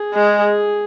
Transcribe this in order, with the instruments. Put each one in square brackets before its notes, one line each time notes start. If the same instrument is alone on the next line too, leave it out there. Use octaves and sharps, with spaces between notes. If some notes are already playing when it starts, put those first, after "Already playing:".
Already playing: [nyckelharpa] G#4
[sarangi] G#3